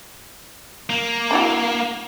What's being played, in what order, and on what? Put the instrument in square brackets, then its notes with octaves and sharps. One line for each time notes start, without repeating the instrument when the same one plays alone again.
[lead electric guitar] A#3
[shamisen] D4 E4 F#4